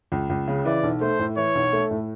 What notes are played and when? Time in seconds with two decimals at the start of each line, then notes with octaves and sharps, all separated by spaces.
0.12 C#2
0.30 C#2
0.48 C#3
0.65 E3 D5
0.83 B1
1.01 A3 C5
1.19 A2
1.37 E3 C#5
1.55 B1
1.73 A3
1.91 A2